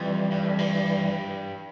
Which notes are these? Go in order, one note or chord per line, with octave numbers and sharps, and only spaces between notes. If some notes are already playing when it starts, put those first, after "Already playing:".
Already playing: F2 E3 G3
G2
F2
G2